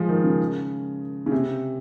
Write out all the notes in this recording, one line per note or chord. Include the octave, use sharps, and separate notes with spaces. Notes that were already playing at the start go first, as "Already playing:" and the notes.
Already playing: F3 G#3
D#3
C#3
C#3
C3